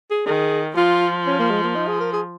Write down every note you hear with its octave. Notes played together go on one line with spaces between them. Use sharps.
G#4
D#3 G#4
F3 F4
C#4
A#3
G#3
A#3
D#4
G#4
A#4
G#4